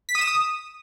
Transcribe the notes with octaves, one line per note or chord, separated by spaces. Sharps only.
B6
D#6
E7
D#6